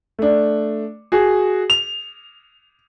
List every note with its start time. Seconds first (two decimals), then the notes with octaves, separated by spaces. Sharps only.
0.19 A3 D4
1.12 F#4 G#4
1.70 F7